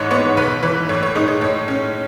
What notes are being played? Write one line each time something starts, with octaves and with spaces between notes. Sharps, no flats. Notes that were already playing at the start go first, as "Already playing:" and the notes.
Already playing: A1 G#2 E3 C#5 D#5
B3 C#5
B1 B4
E3 B4
A2 C#5
C#5
G#3 D#4 D#5
C#5
A2 C#5
C#4